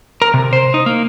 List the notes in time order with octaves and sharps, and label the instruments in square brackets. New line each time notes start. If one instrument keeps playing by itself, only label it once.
[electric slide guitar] A#4
C3
C5
D#4
A#3